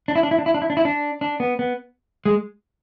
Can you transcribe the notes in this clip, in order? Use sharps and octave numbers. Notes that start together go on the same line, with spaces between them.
D4
E4
D4
E4
D4
E4
D4
E4
D4
E4
D4
D4
B3
B3
G#3